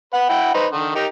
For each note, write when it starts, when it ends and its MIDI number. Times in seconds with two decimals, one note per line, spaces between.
0.13 0.27 71
0.13 0.27 78
0.29 0.53 64
0.29 0.53 78
0.29 0.53 79
0.54 0.66 63
0.54 0.66 71
0.54 0.66 72
0.72 0.95 50
0.72 0.95 51
0.95 1.06 63
0.95 1.06 67
0.95 1.06 70